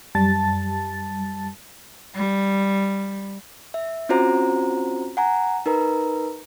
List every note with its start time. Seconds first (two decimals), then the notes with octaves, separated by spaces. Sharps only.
0.15 F#2 G3 A5 A6
2.15 G3
3.74 E5
4.09 C4 C#4 F4 F#4 C5 A#5
5.17 F#5 G#5 A#5
5.66 D#4 A#4 B4 A#5